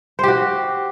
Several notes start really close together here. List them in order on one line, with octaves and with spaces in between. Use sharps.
C5 G4 F#4